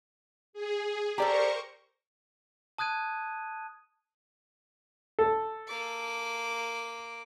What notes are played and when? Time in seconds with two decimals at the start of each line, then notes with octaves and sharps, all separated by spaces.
0.53 G#4
1.18 G4 A4 A#4 C5 D5 A#5 C#6
2.78 A5 D#6 F#6 G#6 D#7
5.19 A4
5.68 A#3 D6